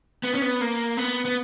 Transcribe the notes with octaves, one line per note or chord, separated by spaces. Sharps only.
B3
C#4
B3
A#3
B3
B3